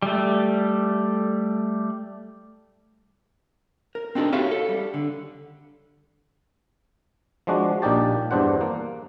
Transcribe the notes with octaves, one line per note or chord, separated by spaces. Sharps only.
G3 A3
A#4
C4 D4 D#4 F#4 A4 A#4
F#4 G4 C#5 E5 F5
A4
G3
D3
F3 G#3 D4 F#4
A#1 A#2 D4 D#4 G4 A5
E2 G2 D4 C5 F#5
A#3